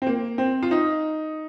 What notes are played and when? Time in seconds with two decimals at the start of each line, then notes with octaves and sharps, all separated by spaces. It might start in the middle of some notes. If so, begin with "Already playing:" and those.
0.02 C4
0.07 A#3
0.38 C4
0.63 F4
0.71 D#4